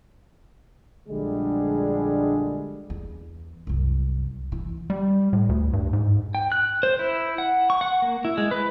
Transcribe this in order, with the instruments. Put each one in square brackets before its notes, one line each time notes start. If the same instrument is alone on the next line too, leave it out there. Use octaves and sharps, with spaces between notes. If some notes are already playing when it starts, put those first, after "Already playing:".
[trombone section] A#1 D3 G3 G#3 D4 G#4
[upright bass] E2
C2 F#2
E3
[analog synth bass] G3
A2
D2
G2
G#2
[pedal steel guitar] G5
F#6
C5
E4
F#5
C#6
F#5
A#3
E4
G#3
B4